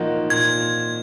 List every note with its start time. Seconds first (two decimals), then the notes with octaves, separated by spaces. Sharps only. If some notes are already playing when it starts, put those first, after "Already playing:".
Already playing: A#2 F3 A#3 D#4 F#4
0.30 A#2 G#6